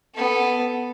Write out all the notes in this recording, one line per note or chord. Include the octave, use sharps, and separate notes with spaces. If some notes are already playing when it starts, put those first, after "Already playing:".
B3 A4